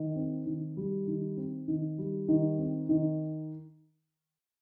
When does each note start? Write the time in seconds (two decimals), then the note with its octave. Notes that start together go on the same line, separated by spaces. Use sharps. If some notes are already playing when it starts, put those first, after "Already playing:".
Already playing: D#3
0.16 C4
0.46 D#3
0.77 G3
1.07 D#3
1.37 C4
1.68 D#3
1.98 G3
2.28 D#3
2.59 C4
2.89 D#3